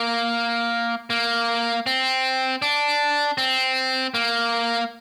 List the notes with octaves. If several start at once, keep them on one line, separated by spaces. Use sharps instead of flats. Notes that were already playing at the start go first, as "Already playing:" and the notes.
Already playing: A#3
A#3
C4
D4
C4
A#3